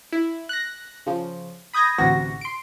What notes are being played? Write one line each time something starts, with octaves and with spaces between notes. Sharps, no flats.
E4
F#6 A#6
C#3 F3
B5 D#6 G6 G#6 A#6
A1 D2 C3 F#4 A#6
C6 D7